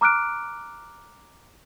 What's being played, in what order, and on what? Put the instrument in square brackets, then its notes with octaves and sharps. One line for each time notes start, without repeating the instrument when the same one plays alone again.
[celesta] A#5 D6 F6 F#6 D7